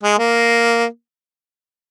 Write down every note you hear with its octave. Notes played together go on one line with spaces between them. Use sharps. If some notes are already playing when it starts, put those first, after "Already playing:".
G#3
A#3